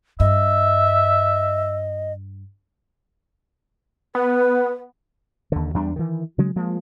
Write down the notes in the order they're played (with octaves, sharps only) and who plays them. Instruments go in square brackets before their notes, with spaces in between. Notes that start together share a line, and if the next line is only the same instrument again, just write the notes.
[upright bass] G2 [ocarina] D#5 [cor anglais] E5
[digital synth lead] B3 [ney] B4
[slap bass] D#2 D3
E2 G3 D4
D#3 E3
C#3 F#3 G#3
F3 G#3 A#3